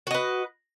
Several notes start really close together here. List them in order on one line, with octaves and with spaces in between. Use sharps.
F#4 D#5 B4